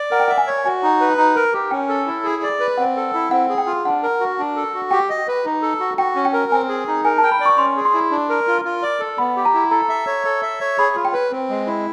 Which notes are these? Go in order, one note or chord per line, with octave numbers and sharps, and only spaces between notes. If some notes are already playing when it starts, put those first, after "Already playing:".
Already playing: D5
A#4 F#5
G5
E5 F#5
G#5
C#5
F#4 G#5
D#4
B4
D#4
A#4
G4
C#4 G5
A4
E4
G#4
D5
B4
C4 F#5
A4
E4
C4 F#5
G#4
G5
F4
D4 F#5
A#4
F#4
D4
A4
F#4
G4 G5
D#5
B4
D#4
A4
F#4
F#4 G5
C#4
G5
A#4
C4 G#5
G#4
D#4
A#4 G#5
A5
G5
B5
D5
C#6
C#4 C6
G#4
C6
E4
D4
A#4
F4
F4
D5
A4
B3 B5
G4
A#5
E4
A4 A#5
E5
C#5
A4
E5
C#5
G#4 B5
F4
G5
B4
C4
G#3
E4